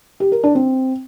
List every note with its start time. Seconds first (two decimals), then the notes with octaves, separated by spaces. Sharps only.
0.20 G4
0.32 A#4
0.43 D4
0.55 C4